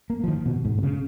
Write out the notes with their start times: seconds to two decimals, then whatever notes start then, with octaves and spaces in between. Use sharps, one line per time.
0.10 A#3
0.24 F3
0.28 D#3
0.46 B2
0.65 G#2
0.78 B2
0.83 C#3